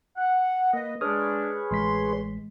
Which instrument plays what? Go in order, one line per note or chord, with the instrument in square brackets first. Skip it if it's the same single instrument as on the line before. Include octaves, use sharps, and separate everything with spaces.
[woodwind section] F#5
[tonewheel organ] A#3 [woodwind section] B4 D#5
[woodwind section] G#3 D4 [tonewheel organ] G#4 B4 C#5 [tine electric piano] D#6 F6
[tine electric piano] A1 G#3 B6 [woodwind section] C6